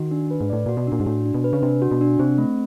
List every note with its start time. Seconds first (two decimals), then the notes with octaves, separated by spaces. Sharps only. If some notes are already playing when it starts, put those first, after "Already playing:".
Already playing: D#3 F#4
0.11 D4
0.31 B4
0.41 G#2
0.50 A2 D5
0.66 A#2 F#4
0.77 B2
0.87 A#2 D4
1.00 G#2
1.06 A2 F#4
1.25 D4
1.35 B2
1.44 B4
1.53 C#3
1.62 C3 D4
1.82 F#4
1.91 B2
2.01 D4
2.19 C3 C4
2.38 A3